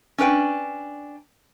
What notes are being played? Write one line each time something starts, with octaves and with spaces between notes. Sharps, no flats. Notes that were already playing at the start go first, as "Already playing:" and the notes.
C#4 D4 B4 G5